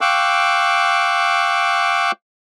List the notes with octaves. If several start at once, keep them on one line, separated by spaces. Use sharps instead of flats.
F5 G5 C#6 D6 E6 F#6